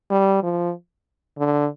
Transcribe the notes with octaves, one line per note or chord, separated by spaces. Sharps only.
G3
F3
D3